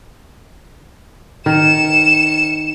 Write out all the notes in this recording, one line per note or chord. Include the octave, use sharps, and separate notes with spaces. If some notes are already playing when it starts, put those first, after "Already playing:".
D#3 C#7 E7